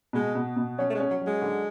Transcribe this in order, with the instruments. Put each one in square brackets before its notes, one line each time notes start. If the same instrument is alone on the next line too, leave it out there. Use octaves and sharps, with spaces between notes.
[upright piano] B2 [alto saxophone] G#3
[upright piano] B2
B2
[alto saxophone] F#3 [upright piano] C#4
[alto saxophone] A3
G#3
[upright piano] C#4
[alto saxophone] F#3
[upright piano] F#3
[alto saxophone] G#3
[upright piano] D3